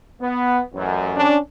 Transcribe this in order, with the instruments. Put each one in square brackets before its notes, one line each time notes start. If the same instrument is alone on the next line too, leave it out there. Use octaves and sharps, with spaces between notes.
[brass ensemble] B3
A1 F#2
[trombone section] C#4 D4